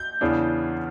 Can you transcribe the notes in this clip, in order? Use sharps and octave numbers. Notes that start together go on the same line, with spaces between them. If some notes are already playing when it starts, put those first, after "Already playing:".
Already playing: G6
E2 C#3 E3 B3 D4